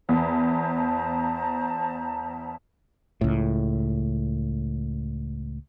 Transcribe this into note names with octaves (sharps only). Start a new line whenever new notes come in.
E2 C5 A5 A#5
C#2 A2